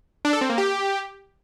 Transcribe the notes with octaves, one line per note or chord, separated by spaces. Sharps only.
D4
A4
C4
A#3
G4